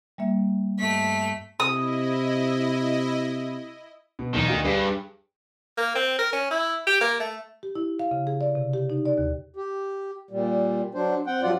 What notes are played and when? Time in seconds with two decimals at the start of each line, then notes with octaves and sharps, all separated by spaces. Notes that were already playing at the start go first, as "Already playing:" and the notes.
0.18 G3 A#3 E5
0.79 G2 A3 D#5 B6
1.60 C3 E4 D#5 D#6
4.19 B2
4.34 B1 E2 D#3
4.48 D2 F#4 F5
4.65 G2 G4 G#4 B4
5.78 A#3
5.95 C4
6.19 A#4
6.33 C#4
6.51 E4
6.87 G4
7.01 A#3
7.20 A3
7.63 G4
7.75 E4
7.99 F5
8.11 C#3
8.27 G#4
8.41 D5
8.55 C3
8.74 G4
8.90 D#4
9.06 D5
9.18 D#2
9.56 G4
10.31 A#2 G3
10.95 F#3 D4 C5
11.27 C4 F#5 G5
11.42 G2 F3 F#3 F4 D5 F#5